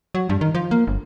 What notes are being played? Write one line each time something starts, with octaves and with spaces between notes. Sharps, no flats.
F#3
G2
D#3
F3
A#3
G1